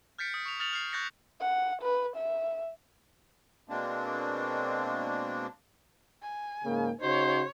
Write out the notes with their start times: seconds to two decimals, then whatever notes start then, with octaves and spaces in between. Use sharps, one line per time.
0.18 F6 G6 A6 B6 C#7 D7
0.34 D#6
0.46 C#6 F7
0.59 D#6 F6 A6 C#7 F7 F#7
0.73 F6 C7
0.93 C#6 F#6 G6 A6 A#6 C#7
1.41 F#5
1.82 B4
2.16 E5
3.69 B2 G#3 A#3 C4 D4
6.22 G#5
6.64 G#2 C#3 A#3
7.01 C#3 D#4 F#4 C5 C#5